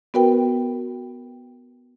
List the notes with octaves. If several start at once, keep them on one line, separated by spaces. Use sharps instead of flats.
B3 F#4 A#4 B4 G5